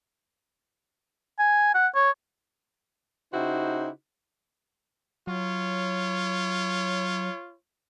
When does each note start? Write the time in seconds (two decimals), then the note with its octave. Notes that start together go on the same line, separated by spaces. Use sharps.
1.39 G#5
1.74 F#5
1.95 C#5
3.33 C#3 D#4 E4 F#4 G4 C5
5.27 F#3 F4 C#5